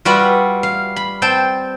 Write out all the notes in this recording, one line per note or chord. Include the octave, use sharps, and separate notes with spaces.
G3 F4 F#4 B4 E5 F#5
F5
B5
C4 C5 G5 A5